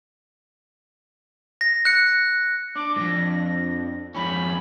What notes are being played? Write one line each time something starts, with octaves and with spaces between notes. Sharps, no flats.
A#6
F#6 C#7
D4 D5 D6
F2 G#2 A#6
F2 F3 G#3 C#4 D#4 B5